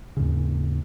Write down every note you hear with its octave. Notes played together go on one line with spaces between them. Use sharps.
D#2 G#2 C#3